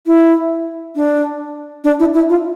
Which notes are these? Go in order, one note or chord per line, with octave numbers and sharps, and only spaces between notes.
E4
D4
D4
E4
E4
F4